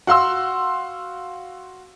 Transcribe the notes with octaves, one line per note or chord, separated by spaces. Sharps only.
F#4 F5 C6 E6